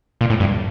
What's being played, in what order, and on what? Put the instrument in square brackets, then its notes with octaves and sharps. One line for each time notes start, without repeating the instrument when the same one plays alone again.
[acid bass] A#2
A2
G2